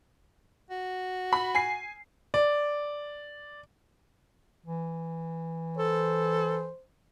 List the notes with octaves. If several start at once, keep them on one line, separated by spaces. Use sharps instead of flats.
F#4
B5
G#5 C7
D5
E3
A4 C5